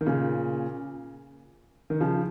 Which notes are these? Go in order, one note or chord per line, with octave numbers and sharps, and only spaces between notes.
D#3
A#2 C#3
D#3
C#3 F3